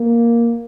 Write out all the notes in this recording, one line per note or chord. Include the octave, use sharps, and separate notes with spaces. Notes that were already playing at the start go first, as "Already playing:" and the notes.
Already playing: A#3